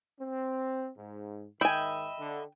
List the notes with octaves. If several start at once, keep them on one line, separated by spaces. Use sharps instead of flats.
C4
G#2
G#2 D#3 D#5 E5 G5 G#5 B5
D3